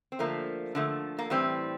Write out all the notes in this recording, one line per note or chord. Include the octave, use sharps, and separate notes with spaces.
C4
D3 F3 A3 A#3
D3 F3 A3
A#3
A2 E3 G3 C4